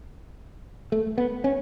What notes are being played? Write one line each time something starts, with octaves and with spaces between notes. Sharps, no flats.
A3
B3
C#4